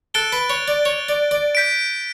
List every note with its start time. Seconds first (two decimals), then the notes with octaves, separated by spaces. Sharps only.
0.14 A4 F#6 A6 D7 G7
0.32 B4
0.50 C#5
0.68 D5
0.85 C#5
1.09 D5
1.31 D5
1.55 G6 B6 D7